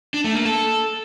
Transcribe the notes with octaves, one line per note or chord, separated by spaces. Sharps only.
D4
A3
A#3
A4